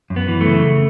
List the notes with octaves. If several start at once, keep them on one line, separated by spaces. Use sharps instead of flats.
F#2
B3
E3
A3
C#3